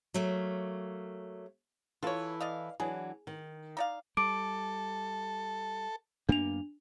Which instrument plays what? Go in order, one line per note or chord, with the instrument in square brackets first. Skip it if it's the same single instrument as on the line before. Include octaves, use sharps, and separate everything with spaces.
[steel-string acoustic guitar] F#3 A3 A#3
[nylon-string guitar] E3 E4 A4 [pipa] F4 C#5
[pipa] D5 D#5 F5
[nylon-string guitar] E3 F#3 D4 [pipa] G#4
[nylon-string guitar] D#3
[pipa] D#4 D5 F5
[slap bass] G3 [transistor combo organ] A4 [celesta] D6 D7
[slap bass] F#2 A#3 B3 [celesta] D4 F7